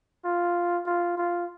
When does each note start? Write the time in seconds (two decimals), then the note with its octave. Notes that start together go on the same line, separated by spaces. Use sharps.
0.24 F4
0.86 F4
1.17 F4